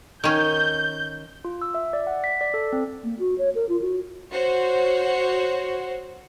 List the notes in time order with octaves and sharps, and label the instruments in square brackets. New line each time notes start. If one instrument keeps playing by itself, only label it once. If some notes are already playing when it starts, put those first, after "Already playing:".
[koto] D#3 C#4 [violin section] G6
[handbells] F4
E6
E5
D5
F#5
B6
D5
A4
C4
[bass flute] A#3
F#4
C#5
A#4
F4
F#4
[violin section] F#4 C5 C#5